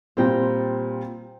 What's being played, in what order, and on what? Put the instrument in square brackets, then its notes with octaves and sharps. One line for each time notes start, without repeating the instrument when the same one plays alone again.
[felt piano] A#2 G3 C4 [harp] C5 G5 A#5